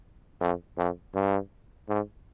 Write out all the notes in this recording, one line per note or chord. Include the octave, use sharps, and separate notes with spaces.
F2
F2
G2
G#2